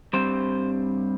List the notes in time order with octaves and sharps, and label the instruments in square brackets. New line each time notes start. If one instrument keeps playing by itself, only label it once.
[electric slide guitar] G2 G3 C4 C5